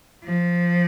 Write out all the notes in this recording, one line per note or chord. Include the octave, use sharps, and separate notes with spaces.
F3